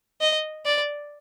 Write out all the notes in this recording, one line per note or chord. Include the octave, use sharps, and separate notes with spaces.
D#5
D5